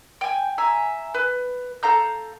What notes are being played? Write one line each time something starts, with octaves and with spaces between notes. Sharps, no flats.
G5 G#5
E5 G#5 A#5
B4
A4 F5 A#5 G6